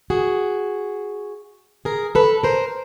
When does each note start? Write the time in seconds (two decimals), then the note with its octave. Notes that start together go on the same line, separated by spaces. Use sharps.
0.10 F#4 G#4
1.85 G#4 A#4
2.15 A4 B4
2.43 A#4 C5